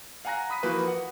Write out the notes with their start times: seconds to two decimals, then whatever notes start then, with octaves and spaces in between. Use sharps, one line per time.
0.25 F5 F#5 G#5 A#5 F#6 A#6
0.50 B5 D#6 B6 D#7
0.63 E3 F3 A#3 F#4 B4
0.88 F#5